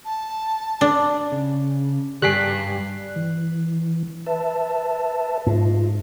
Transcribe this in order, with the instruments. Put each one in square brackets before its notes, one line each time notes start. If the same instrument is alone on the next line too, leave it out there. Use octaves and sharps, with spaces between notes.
[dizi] A5
[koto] D4
[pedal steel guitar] C#3
[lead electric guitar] D2 G2 [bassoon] G3 [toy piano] G4 G#5 [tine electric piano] F#6 B6 C7
[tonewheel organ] E3
B4 E5 A5
[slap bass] G#2 [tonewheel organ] F4